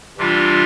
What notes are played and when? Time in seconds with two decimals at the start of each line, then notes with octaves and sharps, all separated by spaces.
0.18 C3 E3 G3 D4 F4